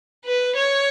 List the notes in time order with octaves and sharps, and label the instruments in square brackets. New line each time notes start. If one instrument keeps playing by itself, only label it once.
[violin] B4
C#5